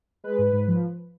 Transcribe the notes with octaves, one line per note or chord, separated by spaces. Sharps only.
G#3 B4
G#2
G#2
F3